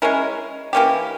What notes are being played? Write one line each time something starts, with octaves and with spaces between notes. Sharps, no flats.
G#3 C#4 E4 A#4
E3 A#3 C#4 G4